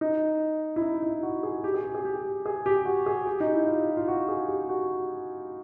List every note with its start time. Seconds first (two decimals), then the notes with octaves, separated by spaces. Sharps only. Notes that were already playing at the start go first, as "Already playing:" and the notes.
0.01 D#4
0.76 E4
0.82 D#4
1.03 E4
1.23 F#4
1.43 G#4
1.64 G4
1.74 G#4
1.84 G4
1.94 G#4
2.05 G4
2.46 G#4
2.66 G4
2.85 F#4
3.06 G#4
3.27 G4
3.40 D#4
3.54 E4
3.67 F4
3.97 F4
4.08 F#4
4.28 G#4
4.48 G4
4.69 F#4